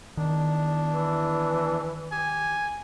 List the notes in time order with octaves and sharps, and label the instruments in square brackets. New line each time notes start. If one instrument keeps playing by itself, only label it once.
[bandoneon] E2 D4 [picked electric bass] D#3
[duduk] E3
[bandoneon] G4 [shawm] G#5